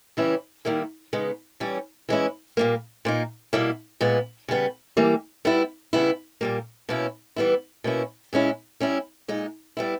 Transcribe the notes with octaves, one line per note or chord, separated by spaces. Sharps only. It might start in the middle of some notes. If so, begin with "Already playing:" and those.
C#3 E3 G3 C#4 E4
D#3 G3 A#3 E4
C#3 G#3 B3 D#4
E3 G3 C#4
E3 G#3 C#4 E4
A#2 G3 A#3
A#2 A#3 D#4
B2 G3 A#3 E4
A#2 G#3 B3
C#3 G3 B3
E3 G3 A#3
G3 B3 E4
C#3 G3 B3 E4
A#2 G3 A#3
B2 A#3 C#4 E4
E3 G3 B3 E4
B2 A#3 C#4 E4
A#2 G#3 C#4 E4
G3 C#4 E4
A#2 G#3 D#4
G3 B3 E4